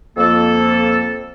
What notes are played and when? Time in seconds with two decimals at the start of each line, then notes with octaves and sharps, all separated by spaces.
0.17 F2 A#3 A4